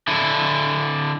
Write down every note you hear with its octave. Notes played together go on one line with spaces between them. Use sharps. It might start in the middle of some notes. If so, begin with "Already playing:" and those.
D3 E4